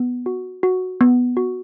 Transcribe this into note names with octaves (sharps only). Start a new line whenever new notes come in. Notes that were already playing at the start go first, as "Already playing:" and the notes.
Already playing: B3
F#4
F#4
B3
F#4